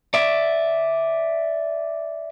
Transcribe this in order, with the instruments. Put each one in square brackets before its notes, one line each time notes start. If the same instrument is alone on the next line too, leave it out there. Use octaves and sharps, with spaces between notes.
[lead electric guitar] D5 E5